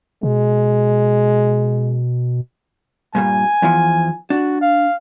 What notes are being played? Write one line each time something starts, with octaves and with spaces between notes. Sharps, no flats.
B2 G#3
G2 A#2 G3 G#5
E2 E3 F3
D4 F#4
F5